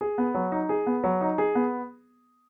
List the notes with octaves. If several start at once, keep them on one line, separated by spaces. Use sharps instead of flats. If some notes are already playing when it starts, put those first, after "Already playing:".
G#4
B3
F#3
D#4
G#4
B3
F#3
D#4
G#4
B3